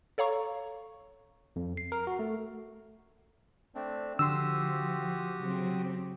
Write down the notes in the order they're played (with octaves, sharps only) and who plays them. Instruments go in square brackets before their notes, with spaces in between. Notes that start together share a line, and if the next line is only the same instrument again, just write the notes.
[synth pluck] A4 C#5 F5 A#5 C#6
[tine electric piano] F2
C7
A#4
F#4
A3
[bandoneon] A3 C4 D4
[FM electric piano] D3 C6 [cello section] F3 [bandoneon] F#4 G4 D#6 [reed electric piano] E6
[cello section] C#3 F#3 C4